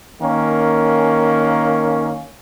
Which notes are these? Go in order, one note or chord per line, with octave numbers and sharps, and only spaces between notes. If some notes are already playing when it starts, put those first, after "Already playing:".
D#3 A#3 C#4